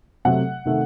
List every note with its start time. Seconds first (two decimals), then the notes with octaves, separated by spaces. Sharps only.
0.25 C3 F#3 A3 F#5
0.65 C3 D#3 A3